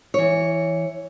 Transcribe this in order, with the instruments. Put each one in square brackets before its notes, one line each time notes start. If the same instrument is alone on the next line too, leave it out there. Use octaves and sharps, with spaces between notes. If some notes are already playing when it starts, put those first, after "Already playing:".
[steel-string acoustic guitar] E3 C#5